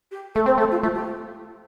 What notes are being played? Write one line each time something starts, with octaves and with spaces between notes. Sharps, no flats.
G4
A3 A4
C4 C5
A3 A4
F4
A3 F4
G4